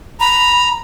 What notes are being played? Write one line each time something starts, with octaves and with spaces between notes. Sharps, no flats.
A#5 B5